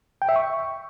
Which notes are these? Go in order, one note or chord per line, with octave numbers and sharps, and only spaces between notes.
G5
E5
C#6